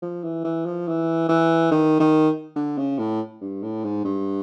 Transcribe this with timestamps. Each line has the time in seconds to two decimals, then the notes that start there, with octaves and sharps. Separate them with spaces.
0.02 F3
0.24 E3
0.44 E3
0.66 F3
0.88 E3
1.29 E3
1.72 D#3
2.00 D#3
2.56 D3
2.78 C#3
2.99 A2
3.41 G2
3.63 A2
3.84 G#2
4.05 G2